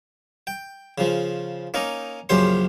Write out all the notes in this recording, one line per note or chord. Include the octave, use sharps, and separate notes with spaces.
G5
C#3 F3
A#3 C#4 D#4 A#5
A#1 F#2 C#3 G4 C5 C6